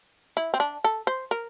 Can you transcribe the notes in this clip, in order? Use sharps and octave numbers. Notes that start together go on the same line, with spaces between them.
E4
C4
D4
A4
C5
A#4